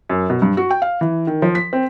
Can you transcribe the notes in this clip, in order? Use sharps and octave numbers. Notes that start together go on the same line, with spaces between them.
F#2
B2
G2
F#4
G5
F5
E3
D#3
F3
B6
C4